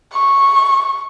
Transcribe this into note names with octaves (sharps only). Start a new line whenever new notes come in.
C#6